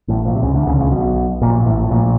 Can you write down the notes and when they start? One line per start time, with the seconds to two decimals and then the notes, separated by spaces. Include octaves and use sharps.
0.08 A1 A2
0.25 A#1 A#2
0.35 C3
0.42 C#2 C#3
0.54 D2 D3
0.66 C#2 C#3
0.75 D3
0.79 C#2 C#3
0.91 B1 B2
1.42 A#1 A#2
1.60 A#2
1.65 A1 A2
1.84 A2
1.90 A#1 A#2